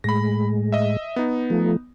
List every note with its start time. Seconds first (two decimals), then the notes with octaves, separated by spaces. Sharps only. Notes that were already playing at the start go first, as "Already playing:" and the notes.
0.04 A2 G#3 B5 A#6
0.72 D#5 E5
1.16 B3 D#4
1.50 F3 A3